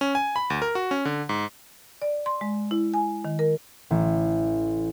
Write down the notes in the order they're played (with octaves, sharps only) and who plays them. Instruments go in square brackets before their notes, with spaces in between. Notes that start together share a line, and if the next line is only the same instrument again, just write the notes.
[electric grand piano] C#4
G#5
B5
D2
A#4
F#4
C#4
D3
G#2
[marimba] D5
C6
G#3
E4
G#5
D#3
A#4
[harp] A1